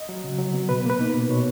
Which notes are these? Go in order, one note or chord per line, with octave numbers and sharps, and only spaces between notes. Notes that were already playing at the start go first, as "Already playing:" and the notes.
Already playing: D#5
F#3
C#3
F#3
B3
B2 B4
A#3 B4
D#4
B2
B2 C#5